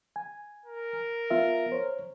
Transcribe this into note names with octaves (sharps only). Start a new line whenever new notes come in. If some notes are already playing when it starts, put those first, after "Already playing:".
G#5
A#4
B3 F4 E5
C5 C#5